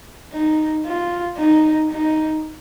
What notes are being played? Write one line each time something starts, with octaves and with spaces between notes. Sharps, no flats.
D#4
F4
D#4
D#4